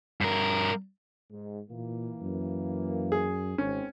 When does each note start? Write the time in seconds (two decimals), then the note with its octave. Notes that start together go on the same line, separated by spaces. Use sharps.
0.21 G2 A#4
1.31 G#2
1.70 A#2 E3 A#3
2.22 F#2
3.12 G#4
3.58 G#1 D#3 G#3 C4 C#4